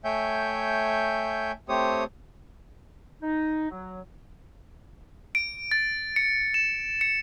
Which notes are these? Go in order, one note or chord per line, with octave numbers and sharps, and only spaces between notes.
A3 C#5 E5 G5 G#5 G6
A3 C4 G4 C5 C#5 D#6
D#4
F#3
D7
A6
C#7
E7
C#7